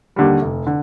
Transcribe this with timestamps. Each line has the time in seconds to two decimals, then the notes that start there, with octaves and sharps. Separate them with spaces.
0.16 D#2 D3 G3
0.42 F1
0.67 D3